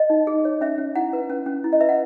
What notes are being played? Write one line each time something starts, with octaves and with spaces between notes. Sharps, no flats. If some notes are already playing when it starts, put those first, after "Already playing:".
Already playing: D#5
D#4
G#4
C#5
C#4 E5
C#4
E4 F#5
B4
C#4
C#4
E4
D#5
B4 E5
F#5